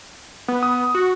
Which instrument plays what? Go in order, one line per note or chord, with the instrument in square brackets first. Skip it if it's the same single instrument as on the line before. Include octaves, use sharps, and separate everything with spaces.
[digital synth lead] B3
[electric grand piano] D#6
[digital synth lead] F#4